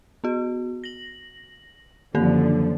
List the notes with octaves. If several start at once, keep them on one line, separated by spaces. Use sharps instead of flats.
B3 F#4
A#6 F#7
F#2 D3 D#3 F3 A#3 A4